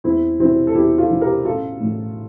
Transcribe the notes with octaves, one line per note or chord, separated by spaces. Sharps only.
E2 C4 E4
C3 E3 C4 E4
A4
E2 E4 G4
F4 A4
C3 E3
G4 A#4
A1 F4 A4
A2 E3